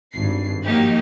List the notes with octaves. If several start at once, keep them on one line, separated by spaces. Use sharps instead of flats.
G#1 G2 C7
F3 F#3 A#3 D#4 G4